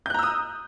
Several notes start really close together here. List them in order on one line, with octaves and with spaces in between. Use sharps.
G6 F#6 A#5 E6 D#6